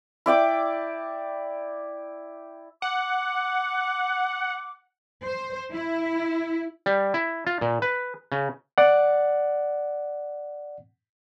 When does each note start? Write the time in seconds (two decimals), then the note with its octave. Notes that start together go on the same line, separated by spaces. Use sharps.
0.26 E4 D5 G5 D6
2.82 F#5 D6
5.24 C5
5.73 E4
6.86 G3
7.14 E4
7.47 F4
7.61 A#2
7.82 B4
8.32 C#3
8.78 D5 F#5